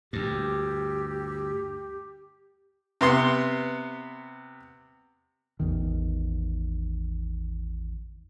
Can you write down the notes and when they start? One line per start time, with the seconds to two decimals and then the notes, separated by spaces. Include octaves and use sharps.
0.13 D2 G2 G4
3.01 C3 B3 C6
5.60 A1 E2 D#3